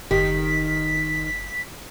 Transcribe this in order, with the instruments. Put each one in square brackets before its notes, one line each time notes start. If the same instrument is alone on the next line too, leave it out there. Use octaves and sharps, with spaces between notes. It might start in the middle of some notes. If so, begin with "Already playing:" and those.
[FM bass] F#1 [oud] D#3 [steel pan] G4 [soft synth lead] B6